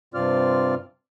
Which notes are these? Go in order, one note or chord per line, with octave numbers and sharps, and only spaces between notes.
G2 C3 C4 F4 D5 F6